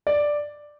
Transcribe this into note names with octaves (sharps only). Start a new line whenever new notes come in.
D5